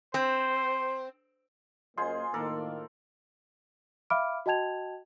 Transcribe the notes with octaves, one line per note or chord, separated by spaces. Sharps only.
C4 C5
F#2 A#3 F4 G#4 C5 D#5 G#5 C6
A2 D#3 A#3 A4 A#4 D5
E5 F5 B5 D6 F6 D7
F#4 D#5 G5 A5 G#6 F7